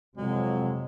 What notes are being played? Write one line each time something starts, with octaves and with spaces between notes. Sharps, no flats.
F2 C3 F#3 G#3